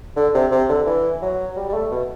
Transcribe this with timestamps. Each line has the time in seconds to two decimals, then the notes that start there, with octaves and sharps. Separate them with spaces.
0.16 D3
0.35 C3
0.52 C3
0.69 D3
0.86 E3
1.22 F#3
1.57 G3
1.69 G3
1.74 A3
1.91 B2